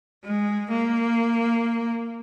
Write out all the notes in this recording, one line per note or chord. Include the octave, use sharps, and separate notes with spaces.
G#3
A#3